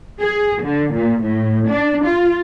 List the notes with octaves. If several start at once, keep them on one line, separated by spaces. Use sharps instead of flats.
G#4
D3
A#2
A2
D4
F4